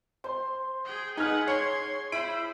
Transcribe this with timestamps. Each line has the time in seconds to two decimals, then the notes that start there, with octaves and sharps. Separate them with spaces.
0.24 C5 C6
0.85 G#4 G5
1.17 D#4 G#4 B4 F#5 F6 G#6
1.48 C#5 C6 G#6 C#7
2.12 E4 C5 B5 D7